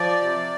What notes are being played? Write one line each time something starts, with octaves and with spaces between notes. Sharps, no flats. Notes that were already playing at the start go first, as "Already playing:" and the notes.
Already playing: F3 D5
C3